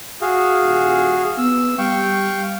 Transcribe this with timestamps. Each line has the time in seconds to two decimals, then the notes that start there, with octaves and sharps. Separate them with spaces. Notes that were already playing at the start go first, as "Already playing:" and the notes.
0.21 F#4 G#4 F5
0.62 D#1
1.38 B3 E6
1.79 G3 F5 G5 C#6